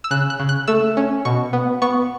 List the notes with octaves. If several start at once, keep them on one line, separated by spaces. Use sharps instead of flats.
E6
C#3 F#6
F#6
C#3
F#6
A3 E6
C#4
B2 C#6
B3
B3 C#6